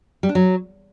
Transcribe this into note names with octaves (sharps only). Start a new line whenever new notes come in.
G3
D4
F#3